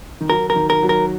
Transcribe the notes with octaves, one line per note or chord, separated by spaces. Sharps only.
D#3
F#3 A#4
A#4
D#3
A#4
F#3
A#4